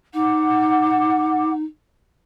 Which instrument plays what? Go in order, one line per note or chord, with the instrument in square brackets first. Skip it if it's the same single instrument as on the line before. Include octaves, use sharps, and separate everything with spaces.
[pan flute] D#4 [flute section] F#5 D6